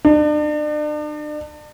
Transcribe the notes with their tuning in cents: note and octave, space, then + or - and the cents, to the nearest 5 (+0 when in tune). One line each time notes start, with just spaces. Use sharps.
D4 +40